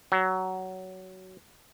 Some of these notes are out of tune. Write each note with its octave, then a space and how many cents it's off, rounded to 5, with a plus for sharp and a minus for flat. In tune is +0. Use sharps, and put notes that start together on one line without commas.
F#3 +15